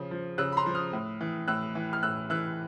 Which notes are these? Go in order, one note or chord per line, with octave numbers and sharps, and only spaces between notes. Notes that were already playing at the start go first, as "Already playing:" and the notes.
Already playing: C#3 F3
F3
C#3 E6 F#6
B5
A#5 C6
F3
D#6 F6
A2
E3
A2 E6 F#6
E3
F6
A2 E6 F#6
E3 E6 F#6